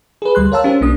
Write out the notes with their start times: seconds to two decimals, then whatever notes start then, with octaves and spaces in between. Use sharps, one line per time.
0.22 G#4 B4
0.35 D2 G3 C6 F#6
0.52 A#4 C#5 F5 A5 E6
0.64 C#4 G4 C5
0.81 B1 A#3 D4 D#6